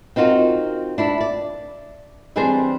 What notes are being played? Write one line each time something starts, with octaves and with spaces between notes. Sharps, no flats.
C4 D#4 F4 F#4 A#4
D4 E4
D5
E3 G3 C4 D4 G#4 C5